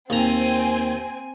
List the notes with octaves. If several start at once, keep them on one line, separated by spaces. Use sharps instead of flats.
D#2 C4 G#5 A#5